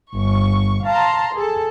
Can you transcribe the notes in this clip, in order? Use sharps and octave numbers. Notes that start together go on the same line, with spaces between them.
G1 C#6
F5 A5 A#5 C6
G#4 A4